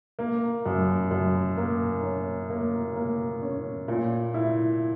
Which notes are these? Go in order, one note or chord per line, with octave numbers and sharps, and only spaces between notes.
A#3
F#2
F#2
A#3
C#4
A#3
A#3
C#4
A#2
E4